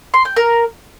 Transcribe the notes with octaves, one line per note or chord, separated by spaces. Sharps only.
C6
G5
A#4